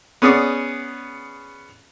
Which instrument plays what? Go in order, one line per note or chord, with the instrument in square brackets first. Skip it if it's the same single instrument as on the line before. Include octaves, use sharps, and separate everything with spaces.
[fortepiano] B3 C#4 G#4 D5 D#6